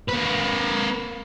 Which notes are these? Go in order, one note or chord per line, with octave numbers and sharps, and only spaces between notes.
A#3 B4